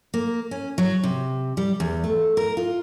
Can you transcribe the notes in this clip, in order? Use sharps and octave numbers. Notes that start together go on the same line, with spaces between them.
A#3
C#4
F#3
C3
G3
E2
A3
A#4
F4